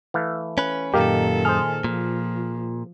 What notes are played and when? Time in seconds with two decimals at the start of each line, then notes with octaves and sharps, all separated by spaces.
0.14 E3 A3 F5
0.58 C#4 B4
0.94 F#2 A#2 D#3 D#4 G4 A4 A#4 F5
1.45 G#4 C5 F6
1.84 A#2 F3